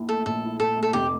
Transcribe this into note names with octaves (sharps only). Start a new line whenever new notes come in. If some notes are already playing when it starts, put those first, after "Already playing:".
Already playing: A#1 A#2 E4
A3 A4
A#1 A4
E4
A#2 A4
A3
A4
F1 G4